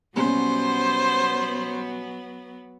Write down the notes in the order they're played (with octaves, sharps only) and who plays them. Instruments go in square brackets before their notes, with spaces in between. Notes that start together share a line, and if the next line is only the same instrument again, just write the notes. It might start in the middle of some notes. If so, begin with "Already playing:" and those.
[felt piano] B2 G3 C#4 [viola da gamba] F#3 B3 [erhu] C5